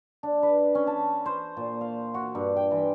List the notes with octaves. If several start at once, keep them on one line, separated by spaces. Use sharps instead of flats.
D4
B4
C#4
A5
C5
A#2
F5
F#4
G2
G5
E3